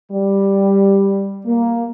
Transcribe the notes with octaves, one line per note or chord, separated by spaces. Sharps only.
G3
A#3